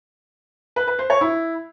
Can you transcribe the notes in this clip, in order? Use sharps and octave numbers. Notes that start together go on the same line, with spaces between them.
B4
B4
C5
C#5
E4